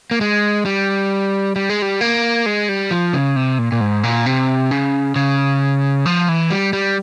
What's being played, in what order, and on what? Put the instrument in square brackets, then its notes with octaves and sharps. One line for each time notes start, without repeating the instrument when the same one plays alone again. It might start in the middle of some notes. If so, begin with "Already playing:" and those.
[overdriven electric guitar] A#3
G#3
G3
G3
G#3
G3
A#3
G#3
G3
F3
C#3
C3
A#2
A#2
G#2
A#2
C3
C#3
C#3
F3
E3
G3
G3